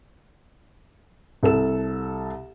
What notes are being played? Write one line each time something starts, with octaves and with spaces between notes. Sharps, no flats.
C2 A4 E7